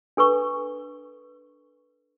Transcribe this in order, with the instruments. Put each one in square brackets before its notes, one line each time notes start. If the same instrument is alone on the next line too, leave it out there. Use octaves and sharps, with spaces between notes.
[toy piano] D4 A4 B4 C#6